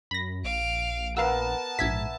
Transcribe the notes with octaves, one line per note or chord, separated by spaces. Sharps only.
F#2 B5 A#6
A#1 F5 D7
B3 A#4 F5 F#5 A5 E6
A#1 G#2 E5 G#6 B6